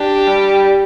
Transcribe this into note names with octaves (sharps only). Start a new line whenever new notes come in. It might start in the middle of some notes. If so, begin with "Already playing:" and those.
Already playing: D4 G4
G3